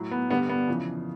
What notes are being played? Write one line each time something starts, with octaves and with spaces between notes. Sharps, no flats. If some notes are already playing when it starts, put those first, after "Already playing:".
Already playing: A2 F#3
B3
G2 D3 G3 B3
B3
F2 C#3 E3